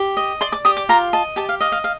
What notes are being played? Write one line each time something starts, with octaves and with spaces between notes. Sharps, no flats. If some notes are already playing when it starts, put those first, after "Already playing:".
Already playing: G4
D#5
D5 C6
D6
G4 D#6
D6
F4 A#5
D#5 A5
G4 A5
F5
D#5 F5
F5
F5